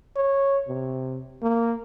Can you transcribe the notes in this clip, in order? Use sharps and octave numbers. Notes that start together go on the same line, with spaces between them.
C#5
C3
A#3